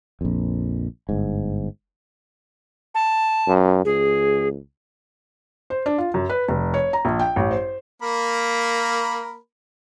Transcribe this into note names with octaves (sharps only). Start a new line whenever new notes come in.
A#1 F2
G1 G#2
A5
F#2
C#2 G#4
C5
D4
F4
F#2
B4
F1
C#5
A#5
A#1
G5
A1
C5
A#3 A#4 B5